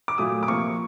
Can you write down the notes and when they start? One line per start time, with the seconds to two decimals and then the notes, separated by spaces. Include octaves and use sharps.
0.08 D6
0.18 A#2 F#3 A3 D#6
0.43 D6
0.47 C3 F3 A#3 C#6